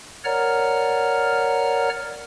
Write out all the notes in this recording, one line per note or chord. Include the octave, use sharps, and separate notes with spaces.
A#4 C#5 D5 F#5 A#5 F6